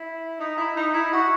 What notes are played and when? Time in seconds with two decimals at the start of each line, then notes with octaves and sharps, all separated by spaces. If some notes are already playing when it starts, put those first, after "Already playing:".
Already playing: E4
0.39 D#4
0.57 E4
0.76 D#4
0.94 E4
1.13 F#4